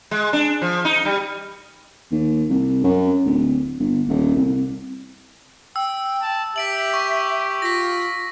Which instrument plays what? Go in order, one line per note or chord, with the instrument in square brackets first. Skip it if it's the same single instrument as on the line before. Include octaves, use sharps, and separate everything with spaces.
[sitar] G#3
D4
F3
D#4
G3
[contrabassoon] D#2
C2
F#2
D1
G1
D#1
C2
[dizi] G5 [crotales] E6
[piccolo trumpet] A5
[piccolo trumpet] G4 [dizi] E5 [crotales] B6 D7 F#7
[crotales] C#6
[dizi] F4 [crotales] A#6 B6